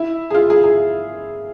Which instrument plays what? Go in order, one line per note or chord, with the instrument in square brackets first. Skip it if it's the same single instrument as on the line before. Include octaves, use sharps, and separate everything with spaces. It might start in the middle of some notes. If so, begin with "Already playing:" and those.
Already playing: [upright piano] E4
G#4
F4
G#4
G#4